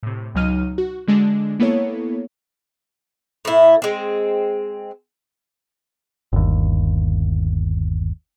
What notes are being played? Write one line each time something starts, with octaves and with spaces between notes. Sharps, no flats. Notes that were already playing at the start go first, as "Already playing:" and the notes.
A2 C3
C#2 B2 F#3 D#4 F6 D#7
F#4
D3 G#3 D4
A#3 B3 E4 A4 C#5
A2 E4
G#3 C4
G1 D#2